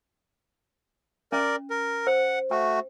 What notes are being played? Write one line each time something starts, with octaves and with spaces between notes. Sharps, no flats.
C#4 A#4 D5
A#4
C5 F#5
A3 F#4 G5